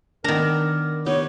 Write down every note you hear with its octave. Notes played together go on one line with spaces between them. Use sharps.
D#3 B3 D4 A#4 A#5
B3 D#4 G4 C#5